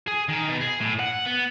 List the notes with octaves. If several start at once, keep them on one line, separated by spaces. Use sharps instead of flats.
G#4
D#3
B2
G#4
A2
F#5
B3